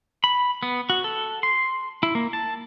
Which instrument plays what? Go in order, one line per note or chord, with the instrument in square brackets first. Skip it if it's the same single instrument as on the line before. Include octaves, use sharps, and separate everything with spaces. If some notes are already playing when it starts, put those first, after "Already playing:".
[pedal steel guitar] B5
B3
F#4
A4
C6
E4
A#3
A5